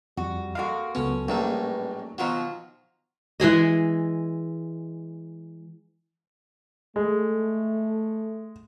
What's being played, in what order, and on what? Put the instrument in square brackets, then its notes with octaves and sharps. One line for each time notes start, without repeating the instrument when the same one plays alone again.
[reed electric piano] F2 [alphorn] G3 [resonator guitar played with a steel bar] F#4
[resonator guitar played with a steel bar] G#3 A#3 F#4 [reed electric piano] A4 F5
[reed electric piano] C#2 F#3 B3 [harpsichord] C#4 [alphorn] A4
[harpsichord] A#1 A2 G3 [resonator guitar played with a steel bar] F#3 [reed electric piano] A#3 C#4 D#4 [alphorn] B4
[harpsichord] B2 F#3 [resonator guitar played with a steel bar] D#3 F4 F#4 [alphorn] F3
[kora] E3 G#3 G#4 D#5
[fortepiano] G#3 [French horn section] A3